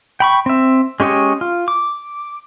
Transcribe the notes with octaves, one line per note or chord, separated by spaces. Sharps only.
G5 B5 C#6
C4 E5
G#3 C#4 G4 C#5 D#5
F4
D6